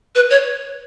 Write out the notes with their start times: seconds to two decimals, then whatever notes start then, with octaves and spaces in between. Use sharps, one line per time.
0.15 B4
0.30 C#5